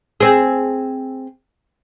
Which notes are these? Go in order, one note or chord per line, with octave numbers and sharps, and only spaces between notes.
C4 G#4